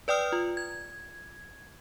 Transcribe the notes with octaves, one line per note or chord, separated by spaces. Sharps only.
B4 D5 G5 D#6 F6
F4
G#6